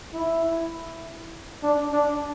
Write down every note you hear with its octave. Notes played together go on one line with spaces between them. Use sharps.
E4
D4
D4